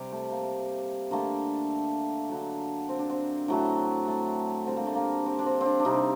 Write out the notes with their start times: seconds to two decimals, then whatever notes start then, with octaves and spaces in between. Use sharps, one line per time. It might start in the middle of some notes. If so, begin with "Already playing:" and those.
Already playing: C3 G3 G4
0.12 A3
0.32 A#3
1.11 D3 A3 A#3
2.30 D3 F#3 A3
2.89 C4
2.99 D4
3.09 C4
3.48 A2 F#3 A3
4.08 A3
4.66 D3 G3 C4
4.77 A#3
4.86 A3
4.95 A#3
5.26 C4
5.39 D4
5.46 C4
5.61 C4 D4
5.80 D4
5.85 C3 G3 D#4